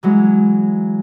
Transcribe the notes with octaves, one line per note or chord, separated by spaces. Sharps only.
E3 F#3 G#3